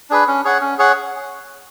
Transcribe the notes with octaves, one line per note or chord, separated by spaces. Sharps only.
D4 G#4 B4
C#4
G#4 C#5 F#5
C#4
G#4 C#5 F#5